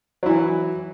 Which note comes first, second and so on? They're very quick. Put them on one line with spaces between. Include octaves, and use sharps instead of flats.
F#3 E4 E3